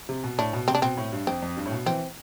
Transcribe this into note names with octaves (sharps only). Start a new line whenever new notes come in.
C3
B2
A2 D4
B2
C3 C4
D4
B2 C4
A2
G2
F2 C4
F2
G2
A2
B2
E3 C4